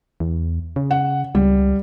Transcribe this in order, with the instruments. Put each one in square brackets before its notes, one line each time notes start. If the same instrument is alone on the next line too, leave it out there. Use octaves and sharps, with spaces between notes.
[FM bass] E2
C#3
[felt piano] F#5
[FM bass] C#2 [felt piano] G3